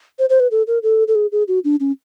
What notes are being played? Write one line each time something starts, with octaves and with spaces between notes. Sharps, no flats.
C5
C5
B4
A4
A#4
A4
A4
G#4
G#4
F#4
D4
C#4